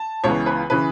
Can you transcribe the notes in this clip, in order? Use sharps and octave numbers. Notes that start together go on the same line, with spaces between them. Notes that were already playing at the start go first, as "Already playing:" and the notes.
Already playing: A5
C#2 C#3 E3 B3 C#5
B4
C#3 E3 C#4 B4